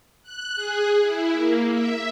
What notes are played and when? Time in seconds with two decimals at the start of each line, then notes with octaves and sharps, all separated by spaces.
0.23 F#6
0.55 G#4
1.00 E4
1.32 A#3
1.70 E5